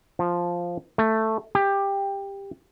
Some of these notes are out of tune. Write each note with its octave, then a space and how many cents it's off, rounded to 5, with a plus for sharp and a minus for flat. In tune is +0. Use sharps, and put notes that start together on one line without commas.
F3 +0
A3 +5
G4 +15